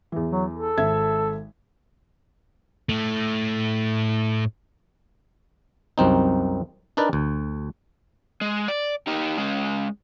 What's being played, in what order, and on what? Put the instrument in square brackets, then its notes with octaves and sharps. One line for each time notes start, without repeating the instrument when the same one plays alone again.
[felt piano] E2 E3
[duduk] F#3
A4
[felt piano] G#1 E5 G#6
[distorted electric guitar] A2 A3
[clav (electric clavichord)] C2 F#2 C4 D#4
D4 D#4 A#4 B4 D5
D2
[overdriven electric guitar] G#3
D5
D#4 G4
G#3 C#4